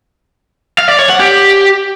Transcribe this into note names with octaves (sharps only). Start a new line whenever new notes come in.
F5
D5
C#5
F#5
G4